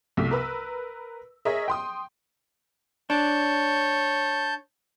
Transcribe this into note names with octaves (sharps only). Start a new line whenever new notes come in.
C2 B2 A3 E6 B6
A#4 B4 E6
G#4 A#4 C#5 D#5 E5
G5 C6 D#6
D4 C#5 A5 G6